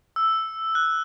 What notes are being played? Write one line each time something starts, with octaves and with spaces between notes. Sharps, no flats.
E6
F#6